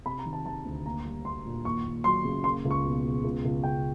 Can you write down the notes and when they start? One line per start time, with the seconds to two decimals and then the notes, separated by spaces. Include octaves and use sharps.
0.06 C3 B5
0.19 A#5
0.26 D#3
0.33 A5
0.46 D#3 A5
0.65 D2
0.86 A#3 A#5
1.05 G3
1.25 A#3 C6
1.46 A#2
1.65 D#2 C#6
1.85 D#2
2.04 F#3 C6
2.25 C#3
2.44 A#3 C6
2.65 C#2
2.71 C#6
2.85 B2
3.04 B2
3.24 C#2
3.45 C#2
3.63 C#3 G5